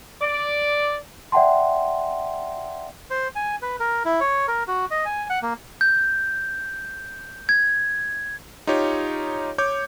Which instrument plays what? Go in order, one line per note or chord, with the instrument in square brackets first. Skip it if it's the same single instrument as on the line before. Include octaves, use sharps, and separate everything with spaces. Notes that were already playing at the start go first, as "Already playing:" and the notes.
[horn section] D5
[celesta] D5 E5 F#5 G5 A5 C6
[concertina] C5
G#5
B4
A#4
E4
C#5
A#4
F#4
D#5
G#5
F#5
A#3
[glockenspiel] G6
G#6
[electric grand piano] D#4 F4 G4 C#5
C#5 D6 G6